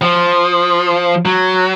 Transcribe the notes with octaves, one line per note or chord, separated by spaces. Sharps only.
F3
F#3